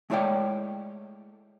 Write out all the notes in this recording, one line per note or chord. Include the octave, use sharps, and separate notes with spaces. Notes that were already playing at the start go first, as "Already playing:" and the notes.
G#3 A3 E4 C#5 D5 G5